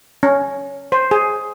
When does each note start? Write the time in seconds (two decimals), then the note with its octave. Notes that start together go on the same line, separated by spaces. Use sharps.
0.23 C#4
0.92 C5
1.11 G#4